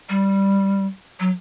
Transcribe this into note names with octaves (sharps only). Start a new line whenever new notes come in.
G3
F#3